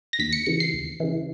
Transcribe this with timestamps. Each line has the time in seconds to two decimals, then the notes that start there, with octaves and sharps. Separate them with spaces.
0.13 A#6
0.19 D#2 B6
0.33 C#7
0.46 C#3 E3 C#7
0.60 C7
0.73 D#2
1.00 C#3 E3